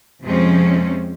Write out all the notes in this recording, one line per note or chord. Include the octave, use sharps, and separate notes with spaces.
F2 C3 F3 G#3 C4 C#4